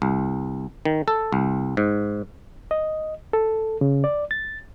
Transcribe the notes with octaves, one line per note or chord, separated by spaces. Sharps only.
C2
D#3
A4
C2
G#2
D#5
A4
C#3
D5
A6